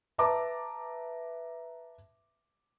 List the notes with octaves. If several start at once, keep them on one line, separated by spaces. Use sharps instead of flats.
B4 E5 A5 A#5 D6